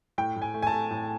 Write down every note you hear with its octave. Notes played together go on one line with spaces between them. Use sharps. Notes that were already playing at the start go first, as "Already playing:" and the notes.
A2 G5
A2
G#5
A3
G#5
A5
A3
A2